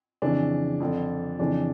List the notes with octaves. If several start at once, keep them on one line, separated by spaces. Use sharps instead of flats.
F2 C#3 E3 D4
F2 D3
F2 C#3 E3 D4